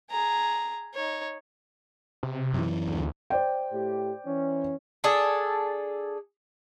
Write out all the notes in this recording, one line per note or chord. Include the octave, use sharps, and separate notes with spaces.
G#4 A#5
D#4 C#5
C3
F#2 E3
D2
C5 D5 G5
A2 G4
E3 C#4
D4 G#4 A4